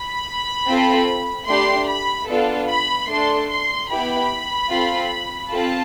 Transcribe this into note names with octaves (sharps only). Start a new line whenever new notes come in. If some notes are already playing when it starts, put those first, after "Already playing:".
Already playing: B5
C4 F4 A4
A3 D4 G4 C6
B5
B3 D4 F4 A4
B5
A3 D4 A4 C6
C6
B3 E4 G4 B5
C4 F4 A4
C4 F4 A4 A5